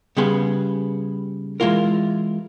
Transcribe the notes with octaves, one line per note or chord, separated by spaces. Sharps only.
C#3 G3 B3 G#4 C6
E3 G#3 A3 E4 F4 A#4